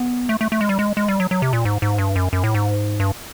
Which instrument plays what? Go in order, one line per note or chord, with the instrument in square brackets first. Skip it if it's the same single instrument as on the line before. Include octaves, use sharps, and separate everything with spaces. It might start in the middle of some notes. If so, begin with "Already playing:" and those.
Already playing: [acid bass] B3
A3
A3
A3
G#3
G3
G#3
G#3
G3
F#3
F#3
C3
A#2
G#2
G#2
G2
F#2
F#2
A2
G#2
G2